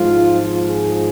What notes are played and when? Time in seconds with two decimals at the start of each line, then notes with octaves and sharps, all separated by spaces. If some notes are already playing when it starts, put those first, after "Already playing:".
Already playing: G#1 G#2 F3 F4
0.67 G#4